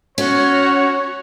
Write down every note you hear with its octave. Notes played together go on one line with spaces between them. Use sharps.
C#4 F#4 C#5